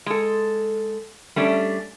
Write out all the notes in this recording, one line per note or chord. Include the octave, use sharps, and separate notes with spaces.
G#3 A4
G3 A3 C#4 D4